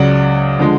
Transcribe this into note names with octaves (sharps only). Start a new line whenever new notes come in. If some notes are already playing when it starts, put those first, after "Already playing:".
Already playing: C#2 C#3 F#3 D5 F#5
D3 F3 G#3